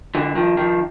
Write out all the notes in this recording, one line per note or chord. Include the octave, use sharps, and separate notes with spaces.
D3 E3
D#3 F3
D#3 F3